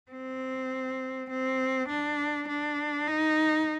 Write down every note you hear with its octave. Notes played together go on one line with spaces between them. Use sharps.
C4
C4
D4
D4
D#4